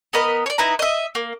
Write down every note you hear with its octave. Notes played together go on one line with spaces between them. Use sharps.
B3 A#4 D#5 B5
C#5 D5
D#4 E4 B4 A#5
D#5 E5
A#3